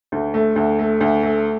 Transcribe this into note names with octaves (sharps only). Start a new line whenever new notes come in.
D2
A3
D2
A3
D2
A3